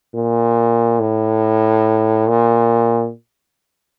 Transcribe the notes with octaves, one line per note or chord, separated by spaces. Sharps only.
A#2
A2
A#2